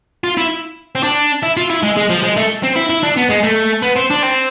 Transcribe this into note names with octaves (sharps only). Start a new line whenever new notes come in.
F4
E4
C4
D4
E4
F4
E4
G#3
G#3
F3
G#3
A3
C4
E4
E4
D4
B3
G#3
A3
B3
C4
D4
C4